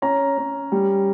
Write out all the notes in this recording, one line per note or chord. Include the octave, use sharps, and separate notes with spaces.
C#4 A#5
C#4
G3